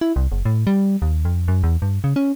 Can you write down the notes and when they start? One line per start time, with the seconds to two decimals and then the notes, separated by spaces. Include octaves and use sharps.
0.01 E4
0.16 C2
0.32 F#1
0.45 A2
0.67 G3
1.02 D#2
1.25 F2
1.48 F#2
1.63 E2
1.82 G2
2.04 C#3
2.16 C#4